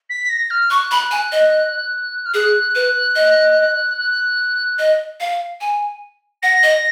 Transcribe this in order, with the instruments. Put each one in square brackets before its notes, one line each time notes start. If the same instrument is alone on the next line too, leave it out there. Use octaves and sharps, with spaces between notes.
[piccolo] B6
A#6
F6
[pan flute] C#6 [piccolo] F#6
[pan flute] B5
G#5
D#5
[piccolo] F6
[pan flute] G#4 [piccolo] F#6
[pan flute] B4
D#5
[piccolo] F#6
[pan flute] D#5
F5
G#5
[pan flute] F#5 [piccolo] A#6
[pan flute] D#5